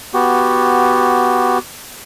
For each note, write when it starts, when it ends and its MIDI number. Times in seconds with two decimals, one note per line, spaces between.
0.14 1.58 59
0.14 1.58 66
0.14 1.58 67